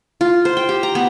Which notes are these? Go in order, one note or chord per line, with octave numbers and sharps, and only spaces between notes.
F4
C5
G5
G4
A#5
B3